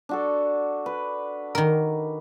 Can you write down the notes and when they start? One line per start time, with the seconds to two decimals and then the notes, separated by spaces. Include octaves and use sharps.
0.09 D4 F#4 A4
0.86 B4
1.55 D#3 A#4